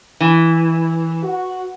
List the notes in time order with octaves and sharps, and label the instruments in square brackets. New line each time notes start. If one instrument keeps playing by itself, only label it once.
[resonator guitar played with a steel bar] E3
[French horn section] F#4